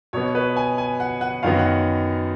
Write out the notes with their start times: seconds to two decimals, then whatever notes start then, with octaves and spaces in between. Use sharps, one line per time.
0.13 B2 F#3 B3 C#5
0.35 B4
0.56 G#5
0.78 G#5
1.00 F#5
1.21 F#5
1.43 F#2 D#3 F#3 B3 F5
1.59 F#5